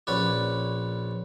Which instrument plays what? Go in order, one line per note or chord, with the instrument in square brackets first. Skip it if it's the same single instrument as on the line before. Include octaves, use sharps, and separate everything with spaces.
[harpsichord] A#1 C#4 B4 D5